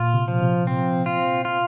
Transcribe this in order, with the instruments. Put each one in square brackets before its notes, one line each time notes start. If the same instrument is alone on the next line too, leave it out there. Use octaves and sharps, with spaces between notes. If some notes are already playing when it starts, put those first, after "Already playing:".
Already playing: [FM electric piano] A#2 [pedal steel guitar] F4
[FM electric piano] C3
[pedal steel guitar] F3
[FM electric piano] C3
[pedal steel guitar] C4
F4
F4